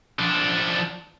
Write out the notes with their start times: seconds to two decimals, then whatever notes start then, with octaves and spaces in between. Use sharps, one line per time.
0.19 F3 D4